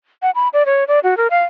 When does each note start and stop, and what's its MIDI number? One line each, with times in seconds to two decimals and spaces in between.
0.22 0.31 78
0.35 0.48 83
0.53 0.63 74
0.66 0.84 73
0.88 0.99 74
1.04 1.17 66
1.17 1.27 70
1.31 1.43 77